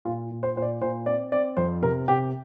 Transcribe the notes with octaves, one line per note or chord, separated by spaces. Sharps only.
A#2 F4
A#2
C5
A#2 C5
D5
A#2 C5
C4 D5
C4 D5
F2 C5
C3 A#4
C3 G4